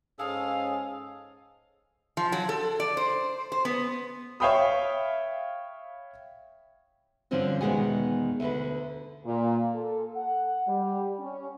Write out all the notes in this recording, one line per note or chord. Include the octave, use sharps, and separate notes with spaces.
G#2 C#4 G#4 A4 F5
F3
F#3
A4
D5
C5
C5
B3
C#5 E5 F5 G5 B5 D#6
G2 D3 F3 C4 C#4 F#4
E2 B2 D#3 G#3 F#5 G#5
D2 D3 B4
A#2
A4
F#5
G3
C#4